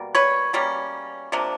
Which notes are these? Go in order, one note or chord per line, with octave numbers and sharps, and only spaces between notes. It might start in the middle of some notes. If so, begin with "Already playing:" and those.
Already playing: B2 G3 A#3
B4 C#5
B2 G3 A#3 C#4
C3 F3 A#3 D4